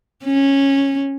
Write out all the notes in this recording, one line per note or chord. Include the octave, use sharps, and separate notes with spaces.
C#4